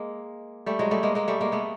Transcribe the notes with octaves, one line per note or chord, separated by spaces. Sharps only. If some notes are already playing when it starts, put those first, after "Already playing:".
Already playing: G#3 A#3
G3 A3
F#3 G#3
G3 A3
G#3 A#3
G#3 A#3
G3 A3
G#3 A#3
A3 B3